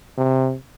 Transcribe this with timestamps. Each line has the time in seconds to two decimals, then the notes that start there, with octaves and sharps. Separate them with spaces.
0.18 C3